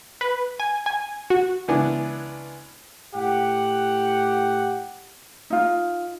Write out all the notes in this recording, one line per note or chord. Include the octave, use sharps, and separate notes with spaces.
B4
G#5
G#5
F#4
C#2 E3 B3 D4 E4 G#5
A2 G4 F#5
D#4 F4